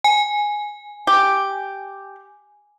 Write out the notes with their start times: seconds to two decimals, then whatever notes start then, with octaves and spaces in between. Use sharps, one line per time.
0.04 G#5
1.07 G4